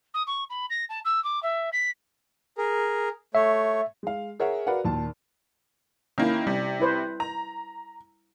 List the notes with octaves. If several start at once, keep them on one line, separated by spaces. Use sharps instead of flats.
D#6
C#6
B5
A#6
A5
E6
D6
E5
B6
G#4 A#4
A3 C#5 E5
G#3 F5
G#4 A#4 C#5 E5 F#5
F#4 A#4 B4 D5 F5 F#5
D#2 A#2 A5
D#3 A#3 C#4 E4
C3 G3
E4 B4 C5
A#5